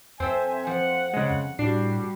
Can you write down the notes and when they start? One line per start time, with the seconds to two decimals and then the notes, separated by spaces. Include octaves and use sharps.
0.20 F2 C4 A4 C5 E5 G#5
0.67 F3 F#5
1.13 C#3 G#3
1.59 A2 G3 D4 F#4 C7